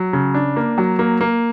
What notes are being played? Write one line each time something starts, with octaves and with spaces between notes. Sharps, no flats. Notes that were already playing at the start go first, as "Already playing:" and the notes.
Already playing: F#3
C#3
D4
A#3
F#3
A#3
A#3